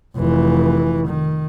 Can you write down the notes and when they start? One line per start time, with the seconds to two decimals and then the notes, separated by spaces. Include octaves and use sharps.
0.17 F1 E3
1.07 D#3